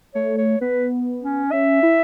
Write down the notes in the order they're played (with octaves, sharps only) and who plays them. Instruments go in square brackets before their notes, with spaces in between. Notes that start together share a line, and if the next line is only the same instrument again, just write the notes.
[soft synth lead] A3 [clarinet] C#5
[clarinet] C#5
[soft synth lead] B3 [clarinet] B4
[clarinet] C#4
[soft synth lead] C#4 [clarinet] E5
[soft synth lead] E4